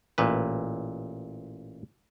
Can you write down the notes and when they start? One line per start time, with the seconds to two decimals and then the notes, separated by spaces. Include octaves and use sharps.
0.18 A1 A#2 B4